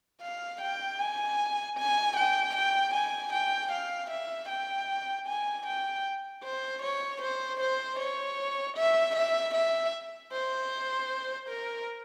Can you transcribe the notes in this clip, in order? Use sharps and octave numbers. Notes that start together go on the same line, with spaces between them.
F5
G5
G#5
G#5
G5
G5
G#5
G5
F5
E5
G5
G#5
G5
C5
C#5
C5
C5
C#5
E5
E5
E5
C5
A#4